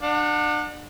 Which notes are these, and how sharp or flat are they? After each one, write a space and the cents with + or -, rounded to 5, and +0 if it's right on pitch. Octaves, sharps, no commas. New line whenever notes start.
D4 +35 F#5 -25